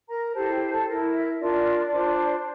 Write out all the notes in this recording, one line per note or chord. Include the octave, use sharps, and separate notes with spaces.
A#4 A#5
E4 G4 A4 C5 A5
G4 G5
A4 A5
E4 A#4
E5
D4 F4 A#4 D5
D4 F4 C5